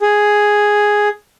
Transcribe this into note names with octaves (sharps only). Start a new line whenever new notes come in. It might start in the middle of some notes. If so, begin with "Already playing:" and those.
G#4